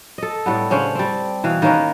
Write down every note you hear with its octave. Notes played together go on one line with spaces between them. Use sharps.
A4 D#5
A2 G3 B3
C#3 C#4 D4 C5
G3 C4
B2 E3 D#5 F5
D#3 A#3 C#4 B4